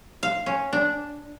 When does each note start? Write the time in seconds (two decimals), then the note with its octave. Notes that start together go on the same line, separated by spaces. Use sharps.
0.23 F5
0.46 C#4
0.73 D4